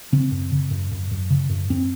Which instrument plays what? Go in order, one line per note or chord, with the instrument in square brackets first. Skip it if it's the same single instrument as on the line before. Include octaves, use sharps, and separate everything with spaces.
[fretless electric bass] C#3 C4
F#2
C#3
F#2
F#2
F#2
C#3
F#2
F#2 C4